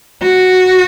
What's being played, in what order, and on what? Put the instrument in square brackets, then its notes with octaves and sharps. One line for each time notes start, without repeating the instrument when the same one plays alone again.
[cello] F#4